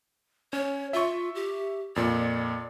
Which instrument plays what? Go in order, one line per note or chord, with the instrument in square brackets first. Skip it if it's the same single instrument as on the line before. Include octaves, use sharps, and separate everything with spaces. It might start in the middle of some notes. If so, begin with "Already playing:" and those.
[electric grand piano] C#4 [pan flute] C#5
[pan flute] F4 [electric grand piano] E5 C#6
[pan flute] G4
[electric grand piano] F2 A#2 [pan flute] D5